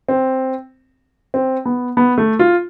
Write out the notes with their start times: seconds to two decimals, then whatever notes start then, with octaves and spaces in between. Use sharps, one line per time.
0.09 C4
1.34 C4
1.66 B3
1.97 B3
2.18 A3
2.39 F4